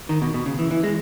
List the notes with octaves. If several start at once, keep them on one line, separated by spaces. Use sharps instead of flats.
D#3
B2
B2
C#3
E3
E3
G#3